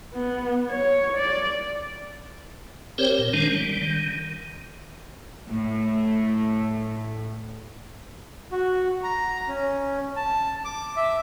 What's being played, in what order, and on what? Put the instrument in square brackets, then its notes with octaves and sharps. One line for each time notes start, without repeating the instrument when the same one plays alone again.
[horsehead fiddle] B3
C#5
D5
[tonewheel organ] C4 G4 A#4 C5 C#5
A#2
D#3 G#3 C#4 D4
G3
D#3
[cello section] A2 A3
[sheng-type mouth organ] F#4
A#5
C#4
A5
D6
E5